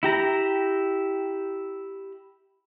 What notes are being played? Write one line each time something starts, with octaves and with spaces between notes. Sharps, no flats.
E4 G4 A#5